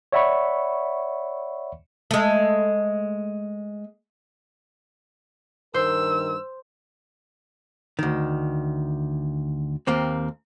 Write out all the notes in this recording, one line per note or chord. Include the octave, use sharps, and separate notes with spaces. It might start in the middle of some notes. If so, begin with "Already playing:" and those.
C#5 D5 E5 F#5 B5 C#6
G#3 A3
G2 D#3 A#4 C5 E6
D2 D#3
D#2 A#3 C4